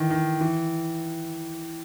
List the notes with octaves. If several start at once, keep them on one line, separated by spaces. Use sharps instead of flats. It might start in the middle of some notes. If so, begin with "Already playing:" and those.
Already playing: D#3 E3
D#3
E3